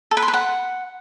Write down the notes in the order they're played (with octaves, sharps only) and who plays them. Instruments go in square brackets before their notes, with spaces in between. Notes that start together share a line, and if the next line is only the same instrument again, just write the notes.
[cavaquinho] A4
B4
C6
B4
F#5